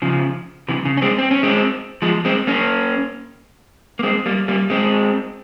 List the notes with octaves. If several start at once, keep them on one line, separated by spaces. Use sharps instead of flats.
C#3 F3
C3 E3
C#3
C#4
G#3 C4
C4
C#4
G#3 C4
F3 G#3
G#3 C4
A#3 C#4
A#3
G#3 C4
G3 A#3
G3 A#3
G#3 C4